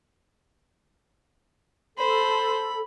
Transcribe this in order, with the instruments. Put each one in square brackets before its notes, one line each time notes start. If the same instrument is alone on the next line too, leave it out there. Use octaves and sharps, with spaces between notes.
[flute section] A4 [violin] C5 [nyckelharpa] B5